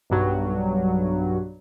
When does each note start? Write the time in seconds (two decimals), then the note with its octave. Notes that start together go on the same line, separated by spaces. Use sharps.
0.10 B1 G2 F#3